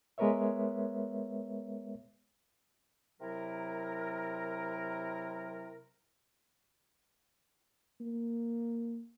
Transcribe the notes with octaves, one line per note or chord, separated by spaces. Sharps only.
G#3 B3 A#4 B4 C#5 E5
C3 F#3 E4 A#4
A#3